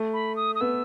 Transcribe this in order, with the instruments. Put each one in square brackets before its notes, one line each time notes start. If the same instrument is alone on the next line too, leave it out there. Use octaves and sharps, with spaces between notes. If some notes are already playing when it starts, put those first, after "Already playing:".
Already playing: [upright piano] A3
[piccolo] B5
D#6
D#6
[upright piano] B3 [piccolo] E6